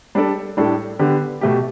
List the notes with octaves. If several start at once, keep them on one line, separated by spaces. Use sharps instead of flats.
G3 D4 A4 D5
A2 G3 D4 A4
D3 B3 G4
B2 A3 G4